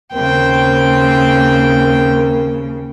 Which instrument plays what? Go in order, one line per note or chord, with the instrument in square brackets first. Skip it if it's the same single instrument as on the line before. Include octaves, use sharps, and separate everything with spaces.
[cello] D#2 C#3 [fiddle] C4 G5 [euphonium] A#4